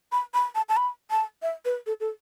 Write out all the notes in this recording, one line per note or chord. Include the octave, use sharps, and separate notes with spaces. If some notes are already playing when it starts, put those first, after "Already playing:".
B5
B5
A5
A5
B5
A5
E5
B4
A4
A4